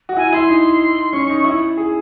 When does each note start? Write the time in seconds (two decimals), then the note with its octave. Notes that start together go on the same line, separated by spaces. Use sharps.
0.09 F#4
0.17 E4 G#5
0.33 E4 C6
0.49 D#4
1.13 C#4 C#6
1.29 D#4
1.44 E4
1.77 G#4